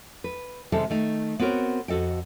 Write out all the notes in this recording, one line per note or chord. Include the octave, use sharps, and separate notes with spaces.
B4
C3 D#3 G3 G#3 A4
D#3 A3 D#4
B3 C4 F#4 A#4 C#5
F2 F#4 A4 D#5 G5